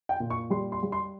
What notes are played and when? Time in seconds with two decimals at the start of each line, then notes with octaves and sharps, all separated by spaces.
0.09 G5
0.20 A#2
0.30 C#6
0.50 G3 C6
0.72 C6
0.83 G3
0.92 C6